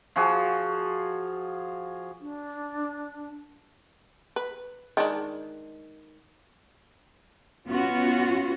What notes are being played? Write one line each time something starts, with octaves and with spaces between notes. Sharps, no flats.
F3 F#4 G#4
D4
B4
D#3 G#3 D4
B3 C#4 F4 F#4